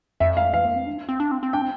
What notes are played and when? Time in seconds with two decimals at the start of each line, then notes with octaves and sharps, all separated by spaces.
0.20 F2 E5
0.37 F5
0.54 E3 F5
0.65 A#3
0.76 C4
0.86 D4
1.09 C4
1.20 D4
1.31 C4
1.43 C4
1.53 D4 G5
1.62 C4